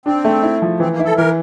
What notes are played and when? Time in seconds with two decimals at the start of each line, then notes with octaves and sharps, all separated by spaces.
0.06 C4 D4
0.25 A3
0.43 E4
0.62 F3
0.80 E3 C4
0.92 A#3
0.99 E4
1.05 A4
1.17 E3 A#4